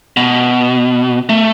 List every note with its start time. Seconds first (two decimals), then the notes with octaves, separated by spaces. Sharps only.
0.17 B2
1.29 A3